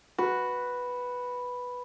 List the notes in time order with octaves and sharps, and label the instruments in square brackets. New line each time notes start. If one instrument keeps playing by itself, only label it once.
[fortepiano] F#4 [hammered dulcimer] B4